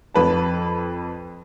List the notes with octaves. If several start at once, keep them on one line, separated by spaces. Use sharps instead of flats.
F2 B4 A5